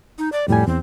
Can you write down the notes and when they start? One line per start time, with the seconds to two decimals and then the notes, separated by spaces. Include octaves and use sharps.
0.18 D#4
0.32 D5
0.48 F2 A2 G3 G#5
0.67 E2 C4